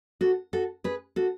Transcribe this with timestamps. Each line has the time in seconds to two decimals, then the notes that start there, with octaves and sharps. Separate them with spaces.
0.21 F#4 A4
0.53 F#4 A4
0.84 G#4 B4
1.16 F#4 A4